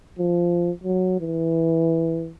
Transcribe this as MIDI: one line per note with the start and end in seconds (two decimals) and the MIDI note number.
0.19 0.71 53
0.83 1.15 54
1.20 2.31 52